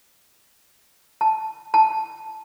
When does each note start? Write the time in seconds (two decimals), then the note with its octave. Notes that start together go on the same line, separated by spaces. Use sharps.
1.21 A5
1.74 A5